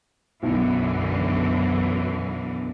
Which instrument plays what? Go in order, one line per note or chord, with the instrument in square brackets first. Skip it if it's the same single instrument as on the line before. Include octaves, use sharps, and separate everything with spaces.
[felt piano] B1 E4 [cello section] F#2 D3 E3